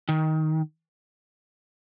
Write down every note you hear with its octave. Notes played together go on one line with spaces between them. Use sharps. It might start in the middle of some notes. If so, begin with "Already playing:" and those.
D#3